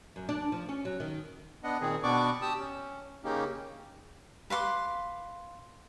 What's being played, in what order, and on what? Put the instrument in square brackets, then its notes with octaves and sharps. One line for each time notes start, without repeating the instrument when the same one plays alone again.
[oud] F#2
D4
F3
C#4
F#3
D#3
[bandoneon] B3 D4 D#5 F#5
A#2 D#3 C4 G#4
B2 B3 D4 D5 C#6 D6
G4 A5 D#6 E6
C#4
C#3 A#3 C#4 D#4 G4
[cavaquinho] B4 F5 C6 D6